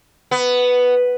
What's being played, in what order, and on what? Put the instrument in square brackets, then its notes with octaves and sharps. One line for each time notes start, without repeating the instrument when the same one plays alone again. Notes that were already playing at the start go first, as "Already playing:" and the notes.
[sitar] B3